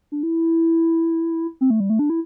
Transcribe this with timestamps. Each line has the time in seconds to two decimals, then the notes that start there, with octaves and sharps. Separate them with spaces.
0.12 D4
0.23 E4
1.61 C4
1.70 A3
1.80 G3
1.90 A3
1.99 D4
2.10 E4